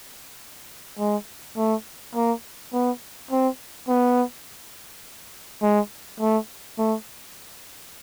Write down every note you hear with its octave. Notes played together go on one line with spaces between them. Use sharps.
G#3
A3
A#3
B3
C4
B3
G#3
A3
A3